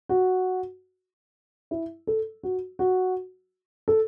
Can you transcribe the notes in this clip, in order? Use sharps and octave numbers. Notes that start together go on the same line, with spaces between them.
F#4
E4
A4
F#4
F#4
A4